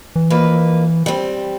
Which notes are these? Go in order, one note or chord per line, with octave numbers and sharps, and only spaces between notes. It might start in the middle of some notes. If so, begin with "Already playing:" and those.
E3
F2 A#3 B4
G3 C4